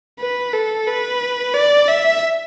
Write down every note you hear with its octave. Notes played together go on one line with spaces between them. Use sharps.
B4
A4
B4
D5
E5